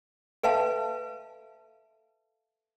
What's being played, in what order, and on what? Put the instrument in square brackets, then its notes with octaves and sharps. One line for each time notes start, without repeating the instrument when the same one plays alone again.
[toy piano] A4 B4 E5 F5 A5